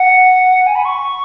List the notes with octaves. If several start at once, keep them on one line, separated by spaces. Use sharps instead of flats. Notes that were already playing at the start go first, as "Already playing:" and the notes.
Already playing: F#5
G#5
B5
C#6